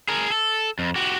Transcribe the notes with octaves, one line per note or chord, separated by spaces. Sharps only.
G#4 A#4
A4
F2
F#4 G4